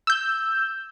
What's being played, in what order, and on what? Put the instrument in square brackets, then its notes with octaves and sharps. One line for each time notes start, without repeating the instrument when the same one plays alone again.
[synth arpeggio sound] E6 G6